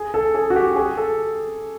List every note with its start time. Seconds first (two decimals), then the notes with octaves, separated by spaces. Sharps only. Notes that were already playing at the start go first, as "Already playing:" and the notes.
Already playing: G#4
0.14 A4
0.34 G#4
0.50 F#4
0.56 G4
0.76 G#4
0.97 A4